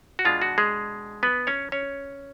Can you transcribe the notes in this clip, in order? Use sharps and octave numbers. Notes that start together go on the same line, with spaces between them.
F#4
B2 G#3 D4 F4
F#4
G#3 G#4
B3 B4
C#4 C#5
C#4 C#5